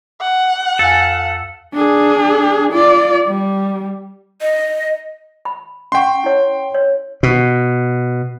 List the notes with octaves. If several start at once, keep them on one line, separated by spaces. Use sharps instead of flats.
F#5
F2 A4 F5 G#5
D4 G#4
F4 D5
G3
D#5
B5
C#4 F#5 G5 C6 C#6
E4 C#5
C#5
B2